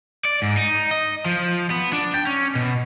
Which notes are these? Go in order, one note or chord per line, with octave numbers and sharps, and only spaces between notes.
D5
G#2
D#4
D#5
F3
B3
D4
G5
C#4
B2